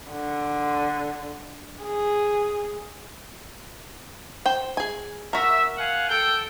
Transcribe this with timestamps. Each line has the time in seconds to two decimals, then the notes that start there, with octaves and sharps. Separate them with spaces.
0.11 D3
1.83 G#4
4.46 C5 G5
4.77 G#4 G#5
5.33 F#4 A#4 E5
5.78 F5 F#5 G#5
6.08 A4 G5